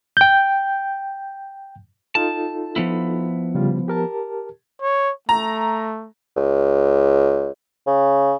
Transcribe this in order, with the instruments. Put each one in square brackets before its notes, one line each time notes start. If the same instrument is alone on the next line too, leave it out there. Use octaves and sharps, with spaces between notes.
[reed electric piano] G5 G6
[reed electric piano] D#4 F4 A4 [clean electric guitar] A5
[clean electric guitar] F3 B3 E4
[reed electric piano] C#3 G3 F4
G4 A#4 A5
[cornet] C#5
[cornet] A3 [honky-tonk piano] A#5
[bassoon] C#2
C#3